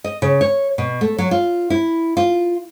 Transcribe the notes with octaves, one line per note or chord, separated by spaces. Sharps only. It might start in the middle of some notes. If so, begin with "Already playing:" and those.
D#5
C#3
C#5
B2
A3
F#3
F4
E4
F4